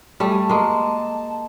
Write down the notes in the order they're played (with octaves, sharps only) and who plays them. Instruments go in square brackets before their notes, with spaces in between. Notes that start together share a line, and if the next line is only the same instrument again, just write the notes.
[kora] G3 A3 [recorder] A5
[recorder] G#5
A5
[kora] G#3 A#3